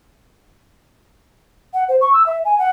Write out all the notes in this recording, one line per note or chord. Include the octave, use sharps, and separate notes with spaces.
F#5
C5
C#6
E6
E5
G#5
F#5